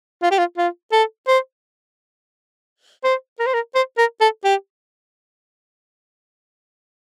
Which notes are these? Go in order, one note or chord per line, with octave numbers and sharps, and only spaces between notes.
F4
G4
F4
F4
A4
C5
C5
A#4
C5
A#4
C5
A#4
A4
G4